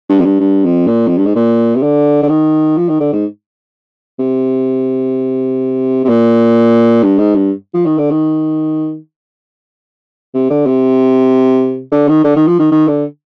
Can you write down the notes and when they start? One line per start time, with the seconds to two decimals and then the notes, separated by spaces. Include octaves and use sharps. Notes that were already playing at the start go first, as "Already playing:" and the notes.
0.09 G2
0.20 F2
0.25 G2
0.40 G2
0.65 F2
0.87 A#2
1.08 F2
1.17 G2
1.26 G#2
1.36 A#2
1.76 C3
1.83 D3
2.23 D3
2.29 D#3
2.77 F3
2.89 D#3
3.00 D3
3.13 G#2
4.19 C3
6.04 C3
6.09 A#2
7.03 G2
7.18 G#2
7.35 G2
7.74 F3
7.86 D#3
7.98 D3
8.11 D#3
10.34 C3
10.50 D3
10.66 C3
11.92 D3
12.08 D#3
12.24 D3
12.36 D#3
12.48 F3
12.59 D#3
12.72 D#3
12.88 D3